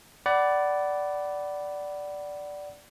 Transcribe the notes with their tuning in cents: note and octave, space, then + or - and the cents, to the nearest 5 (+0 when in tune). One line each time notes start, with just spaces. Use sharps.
D5 -5 F#5 +25 B5 +0